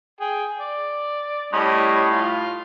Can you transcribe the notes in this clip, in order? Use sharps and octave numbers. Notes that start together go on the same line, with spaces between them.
G#4 G5
D5
A2 G3 C#4 D#5
F4